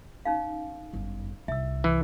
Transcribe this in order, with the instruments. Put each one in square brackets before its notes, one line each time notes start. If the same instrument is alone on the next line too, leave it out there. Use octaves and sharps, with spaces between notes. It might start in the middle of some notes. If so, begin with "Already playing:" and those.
[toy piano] C#4 D#4 F5
[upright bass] G1 F#2
[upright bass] C2 [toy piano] E5 E6
[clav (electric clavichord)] E3